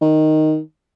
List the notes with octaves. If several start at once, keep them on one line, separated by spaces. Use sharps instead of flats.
D#3